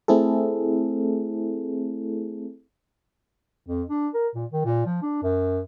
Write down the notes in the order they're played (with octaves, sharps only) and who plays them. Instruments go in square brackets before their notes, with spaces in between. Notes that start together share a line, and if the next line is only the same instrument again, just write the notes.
[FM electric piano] A3 C4 E4 G#4 A4
[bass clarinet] F2
D4
A#4
A#2
D#3
A#2
F3
D4
F#2